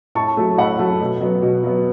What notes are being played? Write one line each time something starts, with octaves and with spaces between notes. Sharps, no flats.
A2 A5 C#6
F#3 A3
A2 F#5 B5
F#3 A3
B2
F#3 B3
B2
F#3 B3